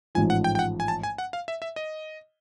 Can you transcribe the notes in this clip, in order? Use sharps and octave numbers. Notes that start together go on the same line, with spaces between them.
A1 G#2 F3 G#5
F#5
G5
G5
F#5
G#5
A5
G#5
F#5
F5
E5
E5
D#5